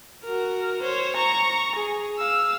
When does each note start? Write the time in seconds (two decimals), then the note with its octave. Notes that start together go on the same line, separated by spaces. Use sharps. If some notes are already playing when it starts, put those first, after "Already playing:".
0.24 F#4 A#4
0.82 C5 C#5
1.16 A#5 C#6
1.76 G#4
2.18 F5 E6